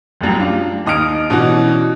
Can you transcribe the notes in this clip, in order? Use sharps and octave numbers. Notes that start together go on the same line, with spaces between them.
F1 C2 F#2 G5
D4 F4
D#2 D#4 D#6 F6 D7
B2 E3 C#4 D4 F#4